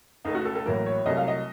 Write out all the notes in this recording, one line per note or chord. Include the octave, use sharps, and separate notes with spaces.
C#2 C#3 A3 D#4
F#4
A4
A4
A1 A2 F#3 A#3 A#4
C#5
C2 C3 F#3 A3 D#5
F5
D#5